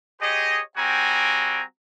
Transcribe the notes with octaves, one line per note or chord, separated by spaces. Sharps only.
G4 G#4 C5 C#5 D#5
G3 C4 F#4 G5 G#5 A#5